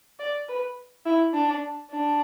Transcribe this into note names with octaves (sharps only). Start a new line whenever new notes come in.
D5
B4
E4
D4
D4